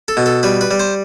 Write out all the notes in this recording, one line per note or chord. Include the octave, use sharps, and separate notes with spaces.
A4
B2
A4
G3 B4
B4
G3
C5